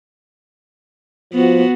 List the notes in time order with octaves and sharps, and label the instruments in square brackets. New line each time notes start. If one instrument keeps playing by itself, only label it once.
[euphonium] F3 [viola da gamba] B3 F#4